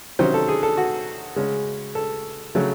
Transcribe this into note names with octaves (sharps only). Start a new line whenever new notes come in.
C3 D#3 F#3 C#4 C5
A4
G#4
A4
F#4
C#3 G#3 C#4
A4
C#3 F#3 A3